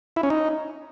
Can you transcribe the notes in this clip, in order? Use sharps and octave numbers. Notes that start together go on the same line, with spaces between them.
E4
C#4
D#4